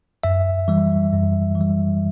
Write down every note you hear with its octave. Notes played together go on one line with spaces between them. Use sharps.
F#2 E5
E3 G3
F#2
E3
G3